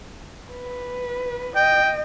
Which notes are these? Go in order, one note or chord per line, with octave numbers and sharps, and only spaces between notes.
B4
D#5 G5